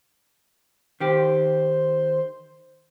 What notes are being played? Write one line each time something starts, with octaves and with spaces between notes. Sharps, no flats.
D#3 G4 C5